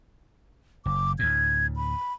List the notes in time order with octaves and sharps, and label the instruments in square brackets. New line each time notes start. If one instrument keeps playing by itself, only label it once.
[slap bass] F#1 [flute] D6
[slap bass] D2 A2 [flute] G#6
[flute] B5